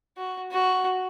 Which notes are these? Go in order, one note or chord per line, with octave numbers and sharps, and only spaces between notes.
F#4
F#4